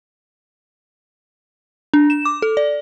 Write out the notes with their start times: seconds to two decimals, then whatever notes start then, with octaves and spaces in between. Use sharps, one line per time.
1.94 D4
2.10 E7
2.25 D6
2.42 A4
2.57 D5